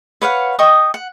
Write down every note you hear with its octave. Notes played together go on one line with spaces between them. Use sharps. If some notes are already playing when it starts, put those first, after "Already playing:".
B4 C#5 F5 F#5
D#5 G5 C#6 D#6
F#5